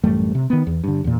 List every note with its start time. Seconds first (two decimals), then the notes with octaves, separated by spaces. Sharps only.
0.04 A1 F#2 G3 A3
0.35 C3
0.50 D#3 B3
0.67 E2
0.84 G2 D3
1.04 E2 A#2